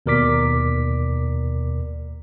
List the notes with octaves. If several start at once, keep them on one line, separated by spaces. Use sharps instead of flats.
D#2 B2 A#4 D5 D6 B6